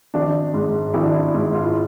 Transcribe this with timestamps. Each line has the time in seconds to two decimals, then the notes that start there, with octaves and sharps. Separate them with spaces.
0.14 G#1 D4
0.54 G#2 G#3
0.94 G#1 E4
1.04 D4
1.14 E4
1.34 G#2 G#3
1.54 F4
1.64 E4